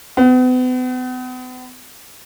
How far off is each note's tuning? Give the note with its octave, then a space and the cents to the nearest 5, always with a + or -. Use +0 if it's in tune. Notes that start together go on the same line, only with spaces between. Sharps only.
B3 +40